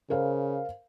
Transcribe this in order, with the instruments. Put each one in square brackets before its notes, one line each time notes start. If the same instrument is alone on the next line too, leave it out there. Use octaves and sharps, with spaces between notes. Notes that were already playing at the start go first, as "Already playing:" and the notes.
[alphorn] C#3 [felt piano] A#4 C5 F5